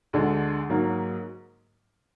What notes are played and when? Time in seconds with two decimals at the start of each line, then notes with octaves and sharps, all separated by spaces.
0.13 D2 D3 G#3 D4
0.69 G#2 F#3 A#3